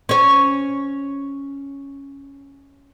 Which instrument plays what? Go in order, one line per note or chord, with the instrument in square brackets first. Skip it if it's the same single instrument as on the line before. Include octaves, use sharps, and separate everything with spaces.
[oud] C#4 C#5